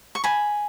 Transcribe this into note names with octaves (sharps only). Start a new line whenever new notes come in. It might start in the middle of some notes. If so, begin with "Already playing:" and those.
C#6
G#5 B5